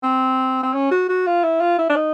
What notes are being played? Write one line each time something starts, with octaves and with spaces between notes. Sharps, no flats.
C4
C4
C#4
F#4
F#4
F4
E4
F4
E4
D4
D#4